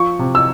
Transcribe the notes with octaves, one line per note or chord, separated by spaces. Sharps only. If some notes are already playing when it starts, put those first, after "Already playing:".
Already playing: F3 C#6
C3
E6